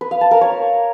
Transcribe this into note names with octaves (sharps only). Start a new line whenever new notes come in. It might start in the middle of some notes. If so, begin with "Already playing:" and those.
B4
F5
A5
A#4
C#5